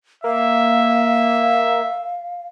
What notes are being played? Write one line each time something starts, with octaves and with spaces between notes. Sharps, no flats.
A#3 E5 F5